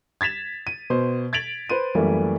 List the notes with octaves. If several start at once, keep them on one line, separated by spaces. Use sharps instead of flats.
G#6 A6 B6 E7 F7
D#7
B2 C5
G#6 A6 B6 D7 F7 F#7
B4 C5 D#7
F#2 E3 G3 A3 A#3